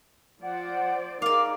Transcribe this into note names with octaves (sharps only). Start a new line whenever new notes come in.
F3 C5 D5 F#5
D#4 G#4 A#4 D5 F5 D6